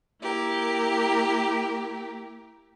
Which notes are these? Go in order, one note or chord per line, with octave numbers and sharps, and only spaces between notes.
A#3 E4 G4 A#4